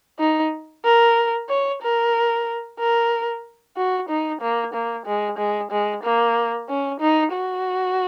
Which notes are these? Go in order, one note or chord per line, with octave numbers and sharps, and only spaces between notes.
D#4
A#4
C#5
A#4
A#4
F#4
D#4
A#3
A#3
G#3
G#3
G#3
A#3
C#4
D#4
F#4